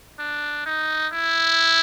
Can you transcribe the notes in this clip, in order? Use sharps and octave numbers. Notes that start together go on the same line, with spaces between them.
D4
D#4
E4